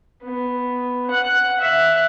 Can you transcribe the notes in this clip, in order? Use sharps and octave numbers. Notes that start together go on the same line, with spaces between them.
B3
F#5 F#6
E5 F#6